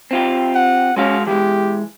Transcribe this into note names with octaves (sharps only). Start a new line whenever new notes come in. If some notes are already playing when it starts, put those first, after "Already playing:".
C4 F4 G4
F#5
G#3 C#4 F#4 F5
E3 G#3 G4